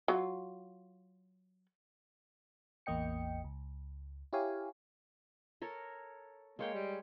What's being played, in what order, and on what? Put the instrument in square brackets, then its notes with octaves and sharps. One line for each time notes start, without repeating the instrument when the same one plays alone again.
[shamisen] F#3 F4
[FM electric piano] A1 E2 A#3 D#5 G5 C#7
C#2
E4 G4 C#5 F5 G#5
[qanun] A4 A#4 C#5
[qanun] G#3 C#5 G5 [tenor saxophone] A#3
[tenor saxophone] G3